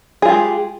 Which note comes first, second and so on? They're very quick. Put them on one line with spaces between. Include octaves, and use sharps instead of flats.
G#4 F4 G4 G#3